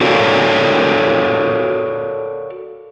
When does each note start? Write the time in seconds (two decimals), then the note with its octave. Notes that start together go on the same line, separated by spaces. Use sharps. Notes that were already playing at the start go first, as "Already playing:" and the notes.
0.01 F#4 A4 A#4 C#5 D5 F5